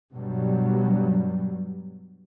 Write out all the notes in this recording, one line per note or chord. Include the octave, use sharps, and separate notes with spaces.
G2 B2 F#3 G3